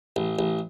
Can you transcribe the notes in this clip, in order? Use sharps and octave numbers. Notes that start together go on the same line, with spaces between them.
A1
A1